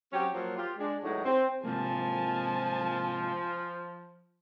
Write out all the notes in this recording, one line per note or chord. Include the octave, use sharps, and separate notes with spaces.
F#3 C4 C#4 G4
F3 F#3 A#3
F4 G4
G#3 D4
E2 A2 F#3 G#3 D#4
C4
G#2 C3 F3 A#3 G#5 A5